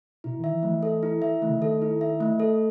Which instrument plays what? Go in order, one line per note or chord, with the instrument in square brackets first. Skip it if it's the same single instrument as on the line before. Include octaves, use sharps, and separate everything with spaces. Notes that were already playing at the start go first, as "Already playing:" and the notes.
[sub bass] B2 [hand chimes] E4
[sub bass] D#3
[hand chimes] E5
[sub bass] E3
[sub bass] F#3 [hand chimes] A3
[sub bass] E3
[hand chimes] A4
E4
E5
[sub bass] D#3 [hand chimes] A3
[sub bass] C#3
D#3
[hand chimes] A4
E4
E5
A3
A4